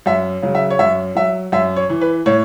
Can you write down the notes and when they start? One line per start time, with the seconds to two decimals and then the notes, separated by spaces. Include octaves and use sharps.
0.06 F#2 E5
0.42 C#3 F#3
0.55 E5
0.70 C#5
0.79 F#2 E5
1.15 F#3 E5
1.52 F#2 E5
1.76 C#5
1.90 E3
2.01 B4
2.26 A2 C#5